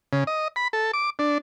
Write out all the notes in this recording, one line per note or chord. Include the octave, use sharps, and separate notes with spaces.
C#3
D#5
B5
A4
D6
D4